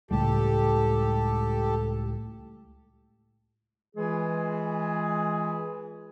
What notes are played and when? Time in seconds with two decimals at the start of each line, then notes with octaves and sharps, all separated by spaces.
0.11 C#2 A2 G3 G4 A4
3.96 E3 G#3 F4 G#4